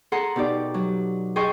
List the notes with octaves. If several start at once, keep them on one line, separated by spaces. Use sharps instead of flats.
G#4 A4 F#5 A#5 C6
B2 D#4 G4 D5
F#3
G#4 D#5 G5 A5 C6 C#6